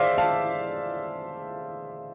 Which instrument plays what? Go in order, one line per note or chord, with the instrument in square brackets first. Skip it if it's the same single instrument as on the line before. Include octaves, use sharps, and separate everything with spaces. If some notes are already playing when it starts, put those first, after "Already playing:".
Already playing: [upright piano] G#3 C5 D5 E5 F5
F5 A5